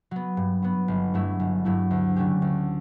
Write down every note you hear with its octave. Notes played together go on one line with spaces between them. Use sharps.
F#3 B3
G2
F#3 B3
G1
G2 F#3 A3 E4
G1
G2 F#3 A3 E4
D2
D3 A3 C#4 G4
D2